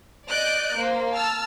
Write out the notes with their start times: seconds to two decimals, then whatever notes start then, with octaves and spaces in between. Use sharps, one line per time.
0.29 D5 D#5 F#6 G6 D7
0.76 A#3 C5
1.13 A5 E6 F6